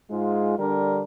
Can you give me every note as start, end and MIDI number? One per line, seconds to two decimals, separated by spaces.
0.11 0.58 44
0.11 0.58 56
0.11 0.58 65
0.58 1.03 50
0.58 1.03 55
0.58 1.03 62
0.58 1.03 70